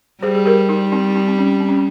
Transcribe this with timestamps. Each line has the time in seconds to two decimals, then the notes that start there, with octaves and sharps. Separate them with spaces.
0.23 G3 G#4 C5
0.35 G#4
0.45 G4 A#4
0.69 D#4 G4
0.92 C4 D#4
1.15 C4 D#4
1.28 C4
1.38 C#4
1.60 C4
1.69 C#4